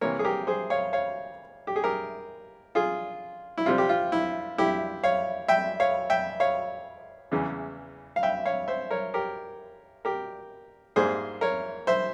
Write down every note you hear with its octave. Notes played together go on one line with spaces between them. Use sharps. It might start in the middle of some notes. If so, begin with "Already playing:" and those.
C3 E3 A#3 A#4 C#5
G#4
G4 A#4
G#4 C5
C#5 F5
C#5 F5
G4
G#4
G4 A#4
F4 G#4
E4
C3 G3 C4 F4
G4
F4
E4
E4 G4
C#5 F5
E5 G5
C#5 F5
E5 G5
C#5 F5
E2 C#3 E3
F5
E5 G5
C#5 F5
C5 E5
A#4 C#5
G4 A#4
G4 A#4
G#2 G3 A#3 G#4 C5
A#4 C#5
C5 E5